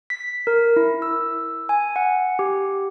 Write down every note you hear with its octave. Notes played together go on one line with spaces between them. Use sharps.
B6
A#4
E4
E6
G#5
F#5
G4